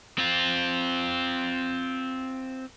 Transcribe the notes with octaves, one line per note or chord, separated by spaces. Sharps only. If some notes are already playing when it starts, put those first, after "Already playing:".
C4 F4